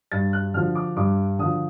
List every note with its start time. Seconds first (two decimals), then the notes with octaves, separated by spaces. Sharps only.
0.12 G2 A6
0.33 F#6
0.54 D3 F3 F6
0.75 D6
0.96 G2 D6
1.39 D3 F3 D#6